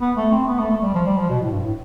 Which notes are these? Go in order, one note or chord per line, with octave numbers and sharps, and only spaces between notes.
B3
A3
C4
B3
A3
A3
G3
F3
G3
F3
B2
A2
G2
A2